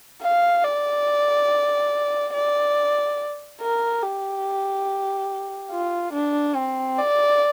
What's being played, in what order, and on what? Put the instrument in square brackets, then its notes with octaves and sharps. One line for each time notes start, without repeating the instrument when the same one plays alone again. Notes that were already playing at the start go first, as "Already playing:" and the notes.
[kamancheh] F5
D5
D5
A#4
G4
F4
D4
C4
D5